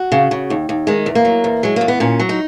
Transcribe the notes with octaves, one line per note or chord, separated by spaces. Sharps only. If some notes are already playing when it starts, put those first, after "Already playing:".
Already playing: F#4
C#3
C#3
D#2
D#2
D#3 G#3
E2
A#3
F#3
E2
F#3 G#3
E2 A#3
B3
A#2 C#4
F#3
D#4